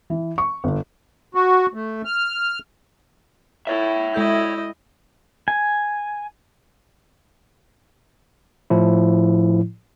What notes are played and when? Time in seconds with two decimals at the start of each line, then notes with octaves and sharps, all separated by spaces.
0.10 E3
0.38 C#6
0.64 G1
1.35 F#4
1.74 A3
2.05 F6
3.67 E4 C#5 E5
4.14 G#3 E4 A4 D#5 G6
5.48 G#5
8.70 A2 F3 E4